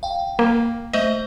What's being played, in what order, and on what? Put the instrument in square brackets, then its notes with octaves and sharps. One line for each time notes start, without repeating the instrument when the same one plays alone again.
[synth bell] F5 G5
[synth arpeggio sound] A#3
[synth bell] A3 C5 E5 [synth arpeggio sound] D#5